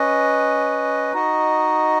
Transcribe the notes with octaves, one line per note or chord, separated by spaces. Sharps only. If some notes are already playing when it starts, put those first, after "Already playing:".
Already playing: C#4 B4 D#5
D#4 F#4 D#5